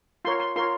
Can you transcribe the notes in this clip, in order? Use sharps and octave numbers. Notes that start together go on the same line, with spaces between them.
F4 A#4 C#5 C6
C6
F4 A#4 C#5 C6